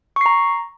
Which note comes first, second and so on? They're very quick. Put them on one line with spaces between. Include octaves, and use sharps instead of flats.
C#6 C7 A#5